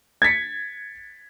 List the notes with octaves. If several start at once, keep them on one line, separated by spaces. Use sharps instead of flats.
G#6 A6 B6 C#7